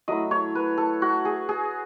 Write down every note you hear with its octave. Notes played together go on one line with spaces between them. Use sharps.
F#3 A3 E4 D#5
C#5
B4
A4
F#4
G#4
G#4